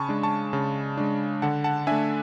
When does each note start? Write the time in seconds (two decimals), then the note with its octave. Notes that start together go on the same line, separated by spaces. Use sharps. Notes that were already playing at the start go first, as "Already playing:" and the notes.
Already playing: C#3 G#5 A5 B5 C#6
0.09 G#3 D4
0.23 A5 C#6
0.53 C#3
0.97 G#3 D4
1.42 D3 F#5 A5
1.64 F#5 A5
1.87 A3 D4 E5 G#5